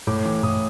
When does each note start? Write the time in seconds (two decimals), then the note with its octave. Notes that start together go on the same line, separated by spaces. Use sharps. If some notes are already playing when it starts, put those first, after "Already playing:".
0.07 A2 D6
0.25 E3 D6
0.43 A2 D#6